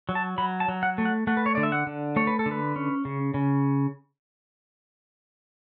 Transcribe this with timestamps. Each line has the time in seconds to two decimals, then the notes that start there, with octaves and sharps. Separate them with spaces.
0.09 F#3
0.15 A5
0.38 F#3 B5
0.60 A5
0.68 F#3
0.83 F#5
0.98 A3
1.05 F#5
1.27 A3 F#5
1.37 B4
1.46 C#5
1.55 D3 D5
1.63 E5
1.72 F#5
1.87 D3
2.16 A3 C#5
2.27 B4
2.39 A4
2.46 D3
2.51 B4
2.76 C#4
3.05 C#3
3.34 C#3